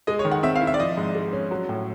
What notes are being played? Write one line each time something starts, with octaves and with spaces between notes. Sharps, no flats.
G#3 D#5
C#5
D#3
F#5
C4 E5
F5
E4
E5
D5
F3 D#5
G#2
G#3
C#4
F#3
A2